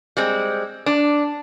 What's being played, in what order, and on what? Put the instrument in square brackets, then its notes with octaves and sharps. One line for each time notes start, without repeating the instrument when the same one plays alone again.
[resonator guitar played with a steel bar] G3 G#3 C4
D4